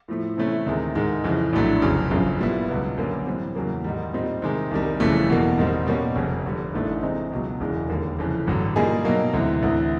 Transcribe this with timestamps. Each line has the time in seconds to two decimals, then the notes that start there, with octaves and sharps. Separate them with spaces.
0.08 A2 F3 A3
0.37 C3 E3 A3 C#4 E4
0.66 D2 C3 D#3 G#3
0.95 G#2 D#3 G#3
1.24 F2 C#3 E3
1.53 A#1 A2 F#3 A3 D4
1.82 F1 F2 C#3 F#3
2.11 G1 F#2 C#3 F3
2.39 A#2 G3 B3 E4
2.69 C#2 B2 F#3 B3
2.98 F#2 D3 G3 A#3 C#4
3.27 A2 E3 G3 C4
3.55 E2 C#3 F#3 A#3
3.84 G#2 D#3 G3
4.13 A#2 G3 C4 D#4
4.42 C3 D#3 G#3
4.71 C2 C3 D#3 G3
5.00 F#1 F2 C#3 E3 A3
5.29 E2 B2 G3 A#3
5.58 G#2 D#3 G3 C4
5.86 B2 G3 A#3 C#4
6.16 F1 F2 C#3
6.45 F2 D3 G3
6.74 G#1 G#2 E3 A3 D4
7.02 C3 E3 G#3 C4 D#4
7.32 C#2 B2 F#3
7.60 E1 E2 C#3 E3 G#3
7.89 D#2 D3 G3 A#3
8.18 F1 F2 C#3 E3
8.47 A1 G2 D3 F#3
8.76 A#2 G3 A#3 D#4 G#4
9.05 B2 F#3 A#3 D#4
9.34 D2 C3 E3
9.62 D2 C3 E3